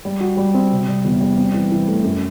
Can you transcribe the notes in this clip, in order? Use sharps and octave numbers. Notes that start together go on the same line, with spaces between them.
G3
F#4
G3
C4
C3
G3
E2
G3
C4
E3
E3
A3
F#2